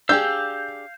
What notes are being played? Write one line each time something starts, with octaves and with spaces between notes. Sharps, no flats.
D4 G4 G#4 F5 E6 G6